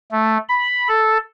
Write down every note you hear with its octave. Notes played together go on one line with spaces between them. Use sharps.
A3
B5
A4